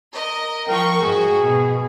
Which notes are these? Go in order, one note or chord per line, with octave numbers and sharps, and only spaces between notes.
A#4 D#5
F3 A#4 G5 C#6
G#2 F#4 G#4
B2